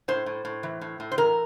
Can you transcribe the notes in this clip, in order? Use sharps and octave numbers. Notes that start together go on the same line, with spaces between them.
A2 C5
A2
A2
E3
A2
A2
C5
E3 A#4